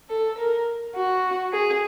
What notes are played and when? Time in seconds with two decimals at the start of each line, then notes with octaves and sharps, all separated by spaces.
0.10 A4
0.38 A#4
0.96 F#4
1.53 G#4